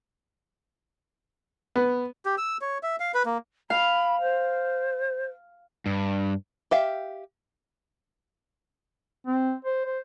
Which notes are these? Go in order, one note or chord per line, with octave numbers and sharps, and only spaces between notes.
B3
G4
E6
C#5
E5
F5
B4
A#3
F5 B5
C5
G2
G4 E5 F5
C4
C5
C5